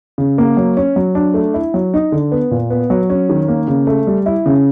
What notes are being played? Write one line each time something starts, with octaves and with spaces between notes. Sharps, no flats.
C#3
A#3
F#3
C#4
F#3
D4
A3
E4
F#3
D#4
D3
B3
A#2
B3
F#3
C#4
D#3
A#3
C#3
A3
G3
E4
C#3